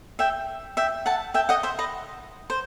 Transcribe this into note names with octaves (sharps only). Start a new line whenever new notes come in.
E5 G5
E5 G5
F#5 A5
E5 G5
D#5 F#5
C5 E5
B4 D#5
C5